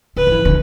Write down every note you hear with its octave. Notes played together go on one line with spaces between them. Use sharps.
D3 B4
F3
E3
D3